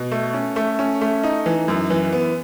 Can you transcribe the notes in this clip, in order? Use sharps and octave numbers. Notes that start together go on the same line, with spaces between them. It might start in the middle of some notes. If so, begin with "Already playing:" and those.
Already playing: B2
A3
C#4
A3
C#4
A3
D#4
E3
F#2
E3
B3